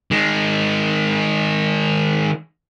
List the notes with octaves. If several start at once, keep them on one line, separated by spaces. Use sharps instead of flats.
D#3 G#3